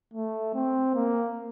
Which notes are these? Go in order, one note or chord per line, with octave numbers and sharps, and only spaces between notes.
A3
C4
A#3